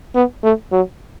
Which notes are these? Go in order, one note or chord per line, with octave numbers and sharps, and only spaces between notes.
B3
A3
F#3